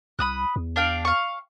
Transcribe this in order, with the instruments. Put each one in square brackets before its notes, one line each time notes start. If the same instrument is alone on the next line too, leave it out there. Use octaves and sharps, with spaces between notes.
[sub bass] C2 [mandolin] B5 D#6 F#6
[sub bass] E2
[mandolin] D4 F5 G5
F5 C#6